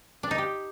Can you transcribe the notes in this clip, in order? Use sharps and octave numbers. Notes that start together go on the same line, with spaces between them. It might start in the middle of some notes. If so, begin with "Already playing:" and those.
D4
D#4
G4